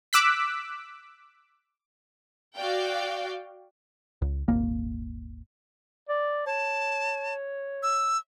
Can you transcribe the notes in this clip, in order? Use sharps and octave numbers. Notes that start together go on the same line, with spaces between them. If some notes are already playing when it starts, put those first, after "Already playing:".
D6 E6 F#6 B6
F#4 D5 F5 G5
C#2
D#1 G#1 A#3
D5
C#5 A5
E6